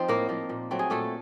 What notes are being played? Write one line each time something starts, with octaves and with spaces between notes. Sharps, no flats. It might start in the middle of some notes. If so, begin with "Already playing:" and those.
Already playing: F3 C4 D#4 C5
A2 A#3 A#4
F3 A#3
A#2
F#3 A3 C4
G#4
A#2 A3 A4